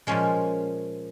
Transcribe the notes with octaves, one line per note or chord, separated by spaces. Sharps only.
A#2 F3 G#3 C#4